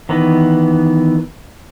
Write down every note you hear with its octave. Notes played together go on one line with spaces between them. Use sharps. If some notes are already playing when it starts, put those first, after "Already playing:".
D#3 E3 B3